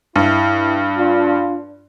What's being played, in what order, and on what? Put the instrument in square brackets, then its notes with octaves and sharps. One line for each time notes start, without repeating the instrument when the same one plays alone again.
[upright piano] G2 [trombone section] E4
[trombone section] D4 F4